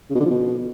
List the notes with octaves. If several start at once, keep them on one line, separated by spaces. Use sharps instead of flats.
C#3
B2
D3
F3
B2